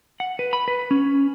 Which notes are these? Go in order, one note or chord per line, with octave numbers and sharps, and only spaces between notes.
F#5
B4
B5
B4
C#4